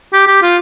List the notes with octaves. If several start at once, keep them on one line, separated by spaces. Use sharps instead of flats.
G4
G4
F4